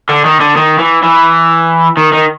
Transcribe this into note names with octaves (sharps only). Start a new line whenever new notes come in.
D3
D#3
D3
D#3
E3
E3
D#3
D#3